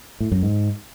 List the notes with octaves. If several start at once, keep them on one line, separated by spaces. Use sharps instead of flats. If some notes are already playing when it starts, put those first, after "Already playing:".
A2
F#2
G#2